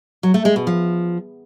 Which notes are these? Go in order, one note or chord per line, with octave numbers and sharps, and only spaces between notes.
F#3
A3
G#3
B2
F3